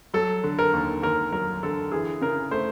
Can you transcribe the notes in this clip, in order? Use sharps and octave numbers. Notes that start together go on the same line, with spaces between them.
F#3 A4
D3
A#4
D#2
D#2 A#4
F#3 A#4
D3 A4
E3 G#4
C#3 A#4
A3 C5